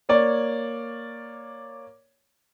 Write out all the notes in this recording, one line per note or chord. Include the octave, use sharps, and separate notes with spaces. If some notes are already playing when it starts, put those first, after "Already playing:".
A#3 C#5 D5